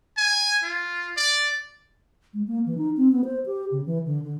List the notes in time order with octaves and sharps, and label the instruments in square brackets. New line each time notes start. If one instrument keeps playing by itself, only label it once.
[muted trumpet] G#5
F4
D5
[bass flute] G#3
A#3
E3
D#4
C4
B3
C5
G4
C#3
E3
D3
D3